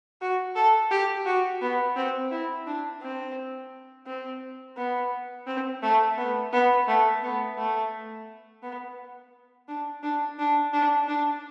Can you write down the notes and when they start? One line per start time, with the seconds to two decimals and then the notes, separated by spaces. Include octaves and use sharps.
0.21 F#4
0.56 A4
0.91 G4
1.26 F#4
1.62 B3
1.96 C4
2.31 E4
2.67 D4
3.02 C4
4.06 C4
4.77 B3
5.47 C4
5.82 A3
6.17 B3
6.53 B3
6.88 A3
7.23 B3
7.58 A3
8.63 B3
9.68 D4
10.03 D4
10.39 D4
10.73 D4
11.08 D4